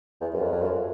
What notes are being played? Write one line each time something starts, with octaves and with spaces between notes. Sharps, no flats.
E2
F#2
F2
F2
F#2